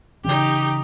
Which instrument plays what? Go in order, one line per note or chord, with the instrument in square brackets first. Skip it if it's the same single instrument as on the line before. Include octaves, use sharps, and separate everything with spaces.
[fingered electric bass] C#3 E3 C#4 [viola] D#4 G4